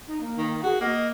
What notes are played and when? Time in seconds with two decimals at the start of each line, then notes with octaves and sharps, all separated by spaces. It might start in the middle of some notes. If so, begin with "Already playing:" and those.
0.08 D#4
0.21 A#3
0.38 D#3
0.63 F#4 G#4
0.81 A#3 D#5